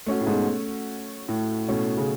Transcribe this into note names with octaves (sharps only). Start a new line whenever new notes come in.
A3 C#4 F#4
A2
G#2 B2
A2
B2 A3 C#4
C#3